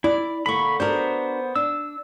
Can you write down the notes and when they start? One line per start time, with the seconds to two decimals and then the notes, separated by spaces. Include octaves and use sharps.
0.04 E4 D5
0.46 D3 A#3 B5 C#6
0.80 B3 D4 F#4 A#4 C5
1.56 D4 E6